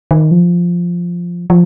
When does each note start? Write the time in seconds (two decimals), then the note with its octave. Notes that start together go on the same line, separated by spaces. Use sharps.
0.11 D#3
0.31 F3
1.50 F3